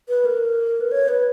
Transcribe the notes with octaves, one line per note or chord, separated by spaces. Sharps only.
B4
A#4
B4
C#5
B4